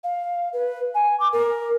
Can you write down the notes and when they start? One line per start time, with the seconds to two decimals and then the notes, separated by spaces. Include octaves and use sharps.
0.04 F5
0.53 B4
0.94 G#5
1.20 D6
1.33 A#4